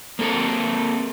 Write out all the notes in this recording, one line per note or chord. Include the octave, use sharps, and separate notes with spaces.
A#3 C4 A4 A#4